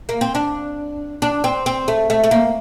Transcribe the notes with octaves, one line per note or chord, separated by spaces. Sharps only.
A#3
C4
D4
D4
C4
C4
A3
A3
A3
A#3